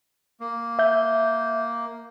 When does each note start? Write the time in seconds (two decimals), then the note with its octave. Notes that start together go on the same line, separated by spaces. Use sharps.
0.40 A#3
0.79 E5 G6